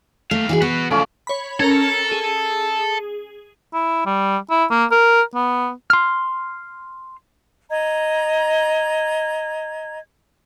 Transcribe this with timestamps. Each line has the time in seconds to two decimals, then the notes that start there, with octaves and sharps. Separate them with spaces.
0.31 D#2 A3 F5
0.49 E3 F#4 G#4
0.62 B3 F#4 B4
0.91 C#2 A2 F3 C#4 D5
1.27 C#5 B5
1.60 C#4 A4 A#4 A#5
2.11 G#4
3.73 E4
4.06 G3
4.50 E4
4.70 A#3
4.91 A#4
5.34 B3
5.90 C6 F6
7.71 D#5 A#5 G#6